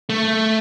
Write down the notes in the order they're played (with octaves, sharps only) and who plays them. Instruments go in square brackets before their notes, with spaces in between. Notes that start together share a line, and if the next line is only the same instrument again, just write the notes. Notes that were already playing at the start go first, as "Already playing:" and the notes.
[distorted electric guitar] A3